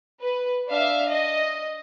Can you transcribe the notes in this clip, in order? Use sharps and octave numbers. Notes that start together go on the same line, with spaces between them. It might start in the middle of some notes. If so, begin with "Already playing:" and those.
B4
D4 E5 F5
D#5